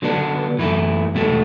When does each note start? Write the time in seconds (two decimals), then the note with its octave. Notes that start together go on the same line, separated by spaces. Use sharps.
0.02 D3 F#3 B3 D4
0.59 F#2 E3 A3 E4
1.15 E2 B2 A3